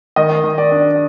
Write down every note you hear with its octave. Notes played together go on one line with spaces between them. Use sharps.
D#3 D#5
D#3
D5
D4